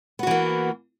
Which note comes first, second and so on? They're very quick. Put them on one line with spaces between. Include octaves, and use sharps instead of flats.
B3 F#4 E3 A#3